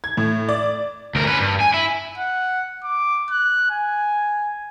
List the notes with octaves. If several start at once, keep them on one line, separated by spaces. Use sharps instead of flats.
G#6
A2
D5
D2 A#4
C#4 B4
G2
G#5
E4
F#5
D6
F#6
G#5